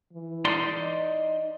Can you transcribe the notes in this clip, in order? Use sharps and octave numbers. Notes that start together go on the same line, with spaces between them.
E3
D#4 D5 C6
D#5